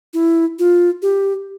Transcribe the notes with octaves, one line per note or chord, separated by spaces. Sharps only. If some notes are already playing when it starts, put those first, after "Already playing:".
E4
F4
G4